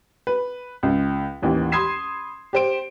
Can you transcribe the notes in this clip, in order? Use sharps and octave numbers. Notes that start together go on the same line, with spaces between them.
B4
C#2
A1 D#2 E3
B5 C6 D#6 G#6 C7 E7
G4 C5 D7